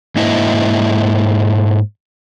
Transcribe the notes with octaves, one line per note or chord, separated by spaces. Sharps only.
G#2 A#3 E4 D#5 E5